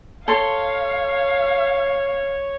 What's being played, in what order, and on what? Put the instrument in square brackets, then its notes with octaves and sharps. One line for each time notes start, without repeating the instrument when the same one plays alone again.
[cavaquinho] A4 C6 [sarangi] C#5 [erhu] F5